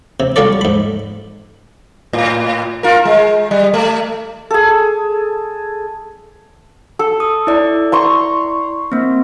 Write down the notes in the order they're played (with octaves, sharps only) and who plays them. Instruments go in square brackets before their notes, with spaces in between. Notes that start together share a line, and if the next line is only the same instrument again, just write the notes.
[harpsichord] C3
G3 F4 F#4 A4 D5
G#2 B5
[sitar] A2
F4 A#4
G#3
G3
A3
[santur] G#4 A4
A4
[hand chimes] D#6
E4 D5
[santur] A#5 C6 C#6
[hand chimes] A#3 C4